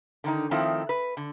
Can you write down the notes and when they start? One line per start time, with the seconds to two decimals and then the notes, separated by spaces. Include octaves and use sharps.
0.24 D3 D#3 D#4
0.51 D#3 F3 A3 C4 D#4 E4
0.89 B4
1.17 D3